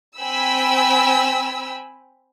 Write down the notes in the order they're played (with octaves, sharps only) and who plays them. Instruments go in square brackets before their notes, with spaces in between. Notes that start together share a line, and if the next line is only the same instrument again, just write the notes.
[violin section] C4 G5 G#5 B5 E6